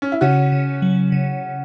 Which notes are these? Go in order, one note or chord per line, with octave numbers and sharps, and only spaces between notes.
C#4
E4
C#3 C#4 F#4
C#3
F#3
C#3